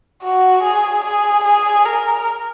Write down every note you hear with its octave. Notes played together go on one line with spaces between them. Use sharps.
F#4
G#4
G#4
G#4
A#4